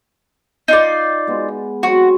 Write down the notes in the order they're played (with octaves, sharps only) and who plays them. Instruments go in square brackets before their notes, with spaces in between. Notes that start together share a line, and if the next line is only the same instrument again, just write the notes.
[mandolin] D#4 F4 D5
[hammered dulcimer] G#3 B3
[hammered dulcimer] F#3 C4 C#6 [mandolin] F#4